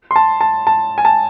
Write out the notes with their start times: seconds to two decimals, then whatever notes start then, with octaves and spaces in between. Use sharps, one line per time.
0.11 C6
0.16 A5
0.41 A5
0.67 A5
0.98 G#5
1.05 A5